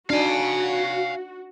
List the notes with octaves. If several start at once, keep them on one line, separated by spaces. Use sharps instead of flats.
D4 D#4 F#4 F5 G#5